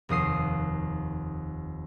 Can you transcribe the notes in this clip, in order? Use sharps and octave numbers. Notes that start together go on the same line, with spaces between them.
F1 D#2 D#6 C7